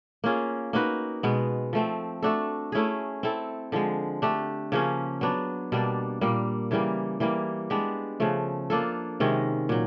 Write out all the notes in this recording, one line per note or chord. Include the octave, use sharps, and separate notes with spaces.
A#3 C#4 F4 G#4
A#3 D#4 F#4 B4
B2 G#3 B3
F3 A3 C4
A3 D4 F#4 A4
A3 C#4 E4 G#4
C4 E4 A4
D3 F3 G#3
A3 D4 G4
C#3 F3 A#3 C#4
F#3 B3 D4
B2 G3 A#3 D4
A#2 G3 A#3
C#3 E3 G3 A#3
E3 G3 A#3
G#3 B3 D4 G4
C#3 F3 A3
A#3 D4 F4 A4
C3 D#3 G#3 C#4
A#2 F#3